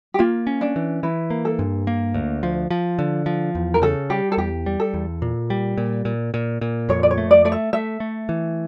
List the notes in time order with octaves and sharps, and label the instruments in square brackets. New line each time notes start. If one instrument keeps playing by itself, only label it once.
[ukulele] G4
[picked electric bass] A#3 [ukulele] F4
[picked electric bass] C#4
[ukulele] D4
[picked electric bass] E3
[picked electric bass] E3 [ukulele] E4
[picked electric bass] A#3
[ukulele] A4
[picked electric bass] G2
A#3
D2
F3
F3
D3
F3
E2
[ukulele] A#4
[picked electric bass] C#3 [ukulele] A4
[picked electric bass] G3 [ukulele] G4
[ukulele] A4
[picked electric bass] E2 [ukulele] G4
[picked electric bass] G3
[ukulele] A4
[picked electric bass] E2
A#2
G3
A#2
A#2
A#2
A#2
[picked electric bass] F2 [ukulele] C#5
[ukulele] D5
C#5
[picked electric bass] A3
[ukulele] D5
[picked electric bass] A3 [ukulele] D5
[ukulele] E5
[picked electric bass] A3 [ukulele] E5
[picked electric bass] A3
E3